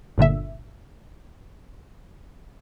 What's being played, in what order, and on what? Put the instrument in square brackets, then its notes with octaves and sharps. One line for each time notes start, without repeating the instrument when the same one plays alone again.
[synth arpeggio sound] G1 A#2 D3 E5